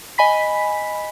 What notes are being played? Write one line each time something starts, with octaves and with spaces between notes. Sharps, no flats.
D#5 G#5 B5 B6